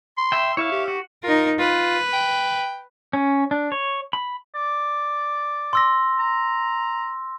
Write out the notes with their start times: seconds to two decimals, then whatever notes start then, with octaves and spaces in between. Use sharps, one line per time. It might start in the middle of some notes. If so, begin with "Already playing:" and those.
0.18 C6
0.32 E5 G5
0.57 E4 C#5 E5 F5
0.72 G4
0.88 F#4
1.24 D#4 F4 A#4
1.59 F4 B4
2.13 G5
3.13 C#4
3.51 D4
3.72 C#5
4.13 B5
4.55 D5
5.73 C6 E6 A#6
6.19 A#5